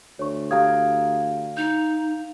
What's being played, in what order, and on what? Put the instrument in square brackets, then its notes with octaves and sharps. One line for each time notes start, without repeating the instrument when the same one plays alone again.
[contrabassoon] D2 [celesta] C#5 C#6
[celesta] G4 D#6 G#6 [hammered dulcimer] F5 G5 A#5
[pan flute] D#4 [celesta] G6 F7